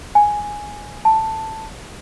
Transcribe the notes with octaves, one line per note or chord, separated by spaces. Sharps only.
G#5
A5